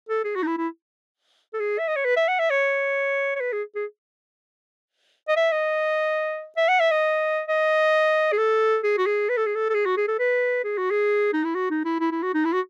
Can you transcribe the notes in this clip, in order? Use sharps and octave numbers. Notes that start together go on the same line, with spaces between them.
A4
G#4
F#4
D#4
E4
E4
A4
G#4
E5
D#5
C#5
B4
E5
F#5
E5
C#5
C#5
B4
G#4
G#4
D#5
E5
D#5
E5
F#5
E5
D#5
D#5
G#4
A4
G#4
F#4
G#4
B4
A4
G#4
A4
A4
G#4
F#4
G#4
A4
B4
G#4
F#4
G#4
D#4
E4
F#4
D#4
E4
E4
E4
F#4
D#4
E4
F#4